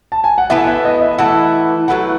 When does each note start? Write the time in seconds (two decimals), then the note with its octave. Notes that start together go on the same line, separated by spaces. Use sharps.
0.12 A5
0.24 G#5
0.38 F#5
0.50 E3 B3 E4 A4 E5
0.67 E5
0.85 D#5
1.02 E5
1.18 E3 A3 E4 A4 F#5
1.88 F#3 A3 E4 B4 F#5